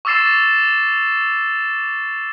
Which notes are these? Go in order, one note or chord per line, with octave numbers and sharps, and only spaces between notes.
C#6 D6 E6 A6 C7 E7